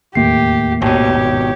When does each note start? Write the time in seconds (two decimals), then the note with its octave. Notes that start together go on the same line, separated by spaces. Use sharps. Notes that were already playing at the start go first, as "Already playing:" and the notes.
0.15 E1 D#2 A2 A#3 G4 C7
0.82 G#1 B2 G4 C#5